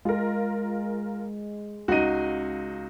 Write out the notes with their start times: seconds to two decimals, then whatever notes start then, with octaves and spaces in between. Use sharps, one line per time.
0.05 G#3 F4 A#4
1.88 C#2 D#4 F#4 D#7